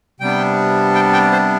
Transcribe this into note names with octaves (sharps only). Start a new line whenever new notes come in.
C3 G3 B3 D4 G5
G5
G5
C5